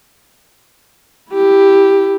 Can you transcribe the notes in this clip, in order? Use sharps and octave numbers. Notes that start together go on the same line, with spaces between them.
E4 G4